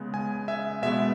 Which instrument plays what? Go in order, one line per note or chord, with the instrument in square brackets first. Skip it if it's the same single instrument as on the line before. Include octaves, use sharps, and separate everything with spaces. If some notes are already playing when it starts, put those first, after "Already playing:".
Already playing: [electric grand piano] C#3 G#3 B3
G#5
E5
B2 G#3 B3 E5